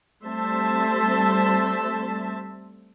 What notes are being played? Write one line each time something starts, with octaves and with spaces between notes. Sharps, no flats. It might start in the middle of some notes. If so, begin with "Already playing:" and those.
G3 A3 C4 C5 E5 A5